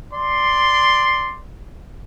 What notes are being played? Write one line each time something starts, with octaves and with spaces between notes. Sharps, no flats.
D5 C6